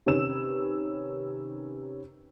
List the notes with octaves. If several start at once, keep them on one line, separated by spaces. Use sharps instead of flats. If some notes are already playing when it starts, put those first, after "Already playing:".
C3 D#3 C#4 B4 E6 E7